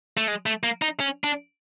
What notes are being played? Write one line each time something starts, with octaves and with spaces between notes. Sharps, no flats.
A3
G#3
A3
A#3
D#4
C#4
D4